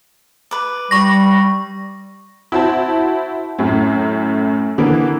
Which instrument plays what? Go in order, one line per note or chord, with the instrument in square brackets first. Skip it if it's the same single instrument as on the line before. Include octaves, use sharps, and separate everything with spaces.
[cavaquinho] B4 D6
[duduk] G3 [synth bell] C#6 A#6
[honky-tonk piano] E4 F#4 C5 A5
F#2 A2
D3 E3 A#3 B3